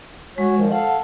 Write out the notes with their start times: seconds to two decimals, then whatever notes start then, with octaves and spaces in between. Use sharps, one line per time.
0.38 G#3 F#4 C#5
0.56 D#3 F3
0.71 A4 F5 F#5